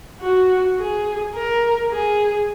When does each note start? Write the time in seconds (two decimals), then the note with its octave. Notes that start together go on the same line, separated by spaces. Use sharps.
0.21 F#4
0.78 G#4
1.35 A#4
1.92 G#4